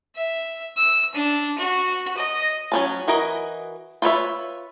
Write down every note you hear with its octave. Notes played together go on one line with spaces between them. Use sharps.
E5
E6
D4
F#4
D#5
F#3 C#4 A5
E3 F#4 A#4 D#5
F4 B4 C#5 E5